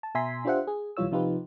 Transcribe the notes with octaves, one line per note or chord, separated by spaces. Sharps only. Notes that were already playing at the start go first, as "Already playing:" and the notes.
A5
B2 E5 G#5 A#5 C6 B6
D4 F4 G4 C5 E5 F#5
G#4
B1 E3 G3 F4 C#5 E6
C3 F3 D#4 F4 G4 B4